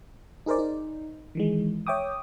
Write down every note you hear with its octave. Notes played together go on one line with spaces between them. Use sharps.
D#4 G#4 A#4 C5 D5
D#4
D#3 E3 G#3
C#5 E5 G5 D6 D#6